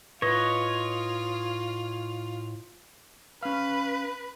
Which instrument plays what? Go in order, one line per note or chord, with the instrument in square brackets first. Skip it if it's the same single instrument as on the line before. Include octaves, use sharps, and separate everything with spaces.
[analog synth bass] A2 [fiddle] F4 [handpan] B4 [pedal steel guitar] C#5 D#5
[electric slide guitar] C#4 F5 [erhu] B4